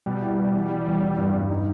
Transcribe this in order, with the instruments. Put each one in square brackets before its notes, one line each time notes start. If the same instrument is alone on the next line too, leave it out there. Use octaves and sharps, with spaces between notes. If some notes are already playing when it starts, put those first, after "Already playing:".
[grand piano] B2 [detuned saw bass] G3
[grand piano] E4
B2
E3
E3
E2
E3
G2
G2
D#4